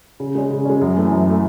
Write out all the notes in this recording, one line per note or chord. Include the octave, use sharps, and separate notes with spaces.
C#3
G#3 C#4
C#3
G#3 C#4
F#2
E3 A3
F#2
E3 A3